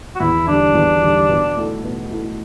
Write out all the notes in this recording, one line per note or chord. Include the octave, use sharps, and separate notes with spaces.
F#4
E2 E4
D3 G3 D4
E2
D3 G3
B2
A3 E4 A4
B2
A3 E4 A4